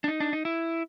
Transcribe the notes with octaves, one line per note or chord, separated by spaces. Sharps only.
D4
D#4
D4
D#4
E4